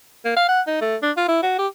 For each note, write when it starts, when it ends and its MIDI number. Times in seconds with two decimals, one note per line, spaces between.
0.25 0.35 58
0.36 0.46 77
0.49 0.61 78
0.67 0.80 63
0.81 0.96 57
1.02 1.11 62
1.17 1.28 65
1.28 1.42 64
1.43 1.58 66
1.58 1.67 67